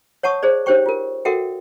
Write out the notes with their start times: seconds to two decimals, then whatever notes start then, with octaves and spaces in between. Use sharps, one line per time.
0.23 C#5 F#5 A5 C#6 D#6
0.43 G#4 C5 D5
0.66 D#4 G4 C5 C#5 G5 C#6
0.86 F4 A#4
1.25 F#4 A4 A#4 E5 F#5 G5